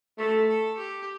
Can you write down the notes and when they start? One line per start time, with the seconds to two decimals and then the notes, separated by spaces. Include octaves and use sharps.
0.18 A3 A4
0.49 A4
0.78 G4